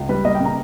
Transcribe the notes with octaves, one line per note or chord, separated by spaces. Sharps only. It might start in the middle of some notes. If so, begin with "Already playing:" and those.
Already playing: C#2
G3 B4
A#3 D#5
G5
C#3
A#5